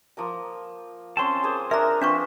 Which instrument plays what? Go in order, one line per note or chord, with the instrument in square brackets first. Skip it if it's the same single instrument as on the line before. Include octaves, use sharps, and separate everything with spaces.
[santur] F3 A#3 A#5
[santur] C4 C#4 C#5 [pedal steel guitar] A5 C6
[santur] A#3 G#4 C5
[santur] D4 G#4 [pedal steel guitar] A#4 [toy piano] E5 A#5
[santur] F3 C4 C6 [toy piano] D4 B4 C#6 [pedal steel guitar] E5